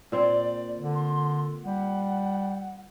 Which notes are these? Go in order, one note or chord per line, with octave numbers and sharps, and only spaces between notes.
A#2 C4 C5 D5
D3
C6
G3 F#5